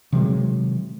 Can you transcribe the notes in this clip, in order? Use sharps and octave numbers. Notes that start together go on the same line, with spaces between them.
C3 D#3 F#3 G#3